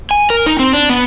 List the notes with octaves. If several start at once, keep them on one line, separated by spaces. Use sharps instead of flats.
G#5
A#4
D#4
C4
D4
B3